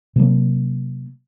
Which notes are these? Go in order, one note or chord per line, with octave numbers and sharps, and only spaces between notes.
C3 F#3 A#3